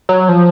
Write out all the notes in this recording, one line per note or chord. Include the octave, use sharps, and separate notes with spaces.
F#3
F3